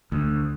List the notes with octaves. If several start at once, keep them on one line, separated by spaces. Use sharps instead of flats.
D2